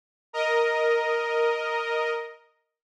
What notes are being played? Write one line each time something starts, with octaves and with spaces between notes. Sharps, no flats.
A#4 D#5